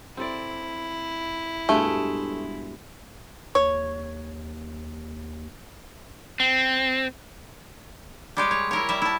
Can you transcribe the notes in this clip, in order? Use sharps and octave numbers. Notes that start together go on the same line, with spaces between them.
C4 E4 A4 D5
G2 B2 G#3 A3
D#2 C#5
C4
G3 G#3 G4 C#5
C#5
E4 A#4 C#5
G3 E5
E4 A5